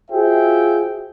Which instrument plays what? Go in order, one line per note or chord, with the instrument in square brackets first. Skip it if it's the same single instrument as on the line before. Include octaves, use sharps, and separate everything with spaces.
[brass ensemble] F4 F#4 G#4 C5 E5 G5